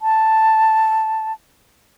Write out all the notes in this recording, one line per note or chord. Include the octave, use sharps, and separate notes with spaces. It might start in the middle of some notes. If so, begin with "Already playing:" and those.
A5